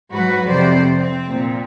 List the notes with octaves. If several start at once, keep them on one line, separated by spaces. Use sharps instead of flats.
G#2 F#3 F#4 B4
F2 C3 C5 D5
C4
A#2